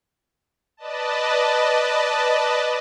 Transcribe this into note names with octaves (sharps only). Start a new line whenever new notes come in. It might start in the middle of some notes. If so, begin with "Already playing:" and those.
B4 D5 D#5 A5